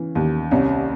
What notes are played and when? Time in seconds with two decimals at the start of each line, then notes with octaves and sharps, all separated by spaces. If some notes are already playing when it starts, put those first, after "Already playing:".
Already playing: C#3 E3
0.15 D#2
0.51 C2 C#4